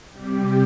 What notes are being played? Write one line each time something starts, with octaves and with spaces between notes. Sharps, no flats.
C3 G3 G4